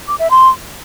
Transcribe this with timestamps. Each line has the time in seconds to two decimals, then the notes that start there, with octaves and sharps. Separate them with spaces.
0.08 D6
0.19 E5
0.31 C6